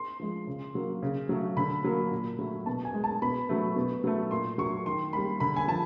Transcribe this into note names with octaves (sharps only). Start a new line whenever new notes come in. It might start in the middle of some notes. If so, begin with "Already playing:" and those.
Already playing: C6
F3 G#3
C#3
F#3 A#3
C#3
F#3 A3
D3 B5
F#3 A#3
A#2
F#3 A3
B2 A5
G#5
G#3
A5
B2 B5
F#3 A3
B2
F#3 A3
A#2 C6
F#3 A3 C#6
D#3 C6
G3 A#3 B5
D3 B5
G#5
F3 A5